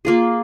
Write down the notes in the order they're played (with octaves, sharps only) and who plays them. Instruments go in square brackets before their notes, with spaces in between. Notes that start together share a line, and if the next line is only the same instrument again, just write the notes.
[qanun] A#3 F4 G#4